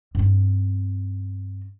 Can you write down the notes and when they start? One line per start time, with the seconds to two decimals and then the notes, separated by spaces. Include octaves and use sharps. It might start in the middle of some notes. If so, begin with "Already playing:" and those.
0.15 G2 C4